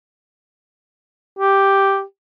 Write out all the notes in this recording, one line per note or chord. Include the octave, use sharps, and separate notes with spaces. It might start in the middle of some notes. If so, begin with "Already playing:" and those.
G4